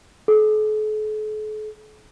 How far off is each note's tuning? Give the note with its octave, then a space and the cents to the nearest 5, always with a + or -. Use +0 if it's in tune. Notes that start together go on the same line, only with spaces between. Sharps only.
A4 -45